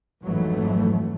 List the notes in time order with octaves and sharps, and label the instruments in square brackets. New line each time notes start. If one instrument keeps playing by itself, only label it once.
[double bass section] G#1 F2 G#2 E3 F#3 A3